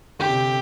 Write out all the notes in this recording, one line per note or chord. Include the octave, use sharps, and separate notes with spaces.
D3 G4
C3